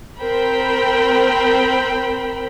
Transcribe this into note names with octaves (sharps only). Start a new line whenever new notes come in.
C4 A#4 C5 G5 B5